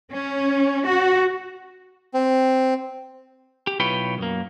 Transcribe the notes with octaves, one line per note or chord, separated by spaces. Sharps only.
C#4
F#4
C4
G4
B1 E4 F4 B4 C#5 G5
F#2 A#3